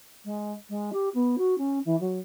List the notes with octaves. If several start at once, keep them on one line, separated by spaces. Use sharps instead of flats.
G#3
G#3
G4
B3
F#4
C#4
E3
F#3